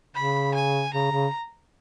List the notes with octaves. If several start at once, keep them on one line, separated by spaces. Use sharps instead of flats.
C#3 B5
G#5
C#3 A#5
C#3